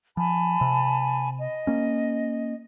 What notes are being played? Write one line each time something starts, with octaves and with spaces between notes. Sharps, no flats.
F3 G#5 A5 B5
C3
D#5
A#3 C#4